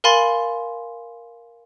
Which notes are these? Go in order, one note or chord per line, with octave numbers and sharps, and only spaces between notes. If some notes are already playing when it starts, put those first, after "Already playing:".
A#4 F5 G#5 B5 C6 A6